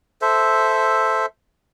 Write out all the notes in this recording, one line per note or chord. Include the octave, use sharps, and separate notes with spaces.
A4 C5 E5